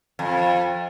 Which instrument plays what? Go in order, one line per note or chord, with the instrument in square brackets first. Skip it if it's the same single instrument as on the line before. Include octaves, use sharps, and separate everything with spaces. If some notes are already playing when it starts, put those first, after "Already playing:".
[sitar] F2